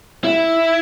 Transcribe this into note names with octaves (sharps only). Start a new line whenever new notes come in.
E4